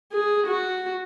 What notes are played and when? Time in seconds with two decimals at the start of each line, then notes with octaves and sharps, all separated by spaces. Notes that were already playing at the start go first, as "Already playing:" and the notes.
0.13 G#4
0.47 F#4